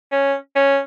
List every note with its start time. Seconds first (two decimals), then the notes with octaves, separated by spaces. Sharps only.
0.12 C#4
0.56 C#4